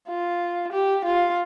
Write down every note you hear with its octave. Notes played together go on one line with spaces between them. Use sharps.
F4
G4
F4